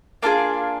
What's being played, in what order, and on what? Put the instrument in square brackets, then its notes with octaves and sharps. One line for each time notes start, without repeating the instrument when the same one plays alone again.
[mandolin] A#3 D4 F4 G#4 F5